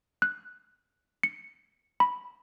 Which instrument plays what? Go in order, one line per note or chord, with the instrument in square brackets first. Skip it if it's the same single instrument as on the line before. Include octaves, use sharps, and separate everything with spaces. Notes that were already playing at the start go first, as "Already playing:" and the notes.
[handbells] F#6
C#7
B5